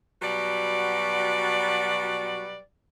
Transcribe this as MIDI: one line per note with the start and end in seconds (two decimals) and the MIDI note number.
0.22 2.59 47
0.22 2.59 54
0.22 2.59 55
0.22 2.59 66
0.22 2.59 71
0.22 2.59 74